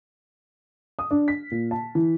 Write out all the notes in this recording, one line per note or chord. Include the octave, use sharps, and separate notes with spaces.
D#6
D4
B6
A#2
A5
E3